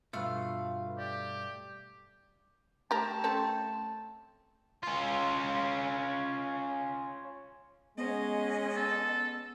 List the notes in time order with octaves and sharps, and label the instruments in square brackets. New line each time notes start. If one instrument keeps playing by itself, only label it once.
[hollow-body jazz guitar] G2 B2 [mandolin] A3 F5 [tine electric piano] F4 B4
[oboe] G4 [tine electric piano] D5
[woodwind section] A3 A5 [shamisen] G4 A#4
[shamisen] C4 C#4 A4
[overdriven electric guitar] C#4 F4
[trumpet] G#3 [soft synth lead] B3 [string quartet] C#4 D#5
[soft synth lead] B3 [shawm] A4